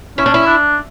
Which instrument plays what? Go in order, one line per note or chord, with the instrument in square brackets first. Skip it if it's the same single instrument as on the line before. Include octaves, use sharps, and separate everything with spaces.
[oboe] C#4 [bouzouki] E4
[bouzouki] D4
E4
[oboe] D4